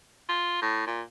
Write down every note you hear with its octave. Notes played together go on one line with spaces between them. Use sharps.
F4
A2
A#2